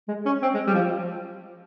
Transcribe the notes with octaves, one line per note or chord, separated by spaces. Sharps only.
G#3
C#4
C4
G#3
G3
F3